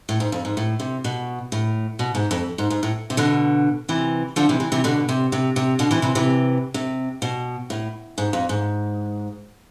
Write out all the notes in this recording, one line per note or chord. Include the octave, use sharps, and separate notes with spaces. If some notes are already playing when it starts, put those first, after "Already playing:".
A2
G#2
F2
G#2
A2
C3
B2
A2
B2
G#2
F2
G#2
G#2
A2
C3
B2 D3
C3 E3
D3 F3
C3 E3
C3 E3
C3 E3
B2 D3
C3
C3
C3
B2 D3
C3 E3
C3 E3
C3 E3
C3
B2
A2
G#2
F2
G#2